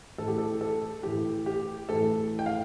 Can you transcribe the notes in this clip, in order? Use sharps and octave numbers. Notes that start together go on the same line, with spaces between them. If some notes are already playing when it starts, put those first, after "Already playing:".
A2 E3 A3 A4
G4
A4
A4
A2 E3 A3 G4
G4
A2 E3 A3 A4
G5
F5